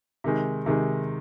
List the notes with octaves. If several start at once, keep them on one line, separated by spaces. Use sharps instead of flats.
C3 D#3 G#3
C3 D#3 G#3